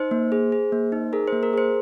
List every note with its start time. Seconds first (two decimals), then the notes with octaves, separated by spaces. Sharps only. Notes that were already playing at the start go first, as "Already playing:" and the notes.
Already playing: D#4 C5
0.11 A#3
0.32 G#4
0.52 G#4
0.72 A#3
0.92 D#4
1.13 G#4 A#4
1.27 C5
1.32 A#3
1.43 A#4
1.53 G#4 C5